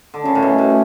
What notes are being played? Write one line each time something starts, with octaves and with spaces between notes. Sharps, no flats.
D3
C#3 C#4
A2
B2
A2